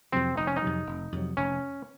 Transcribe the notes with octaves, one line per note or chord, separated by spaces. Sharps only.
F2 C3 F#3 C4
F1 D#4
C#4
D#4
F2 C3 F#3
F1
F2 C3 F#3
F1 C#4